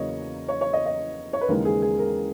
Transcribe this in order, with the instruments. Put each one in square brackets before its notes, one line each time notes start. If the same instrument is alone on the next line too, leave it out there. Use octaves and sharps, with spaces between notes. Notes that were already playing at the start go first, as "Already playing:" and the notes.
Already playing: [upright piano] E2 C#3 F#3 A#3 C#4 C#5 D#5
C#5
C#5
D#5
D#5
C#5
B4
D#2 C#3 E3 G#3 A#4
G#4
G#4
A#4